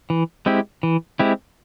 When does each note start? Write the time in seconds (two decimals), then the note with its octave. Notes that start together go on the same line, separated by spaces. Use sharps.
0.10 E3
0.46 G#3 C4 E4 G4
0.83 E3
1.19 G#3 C4 E4 G4